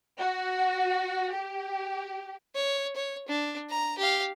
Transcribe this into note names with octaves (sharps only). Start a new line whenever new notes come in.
F#4
G4
C#5
C#5
D4
A#5
G4 F5